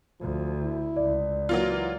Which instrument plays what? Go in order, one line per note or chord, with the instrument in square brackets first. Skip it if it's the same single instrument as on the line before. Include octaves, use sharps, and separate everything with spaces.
[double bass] D2 [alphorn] F3
[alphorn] E4
[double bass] C#2 [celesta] D5
[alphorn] E3 [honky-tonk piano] F#3 A#3 F4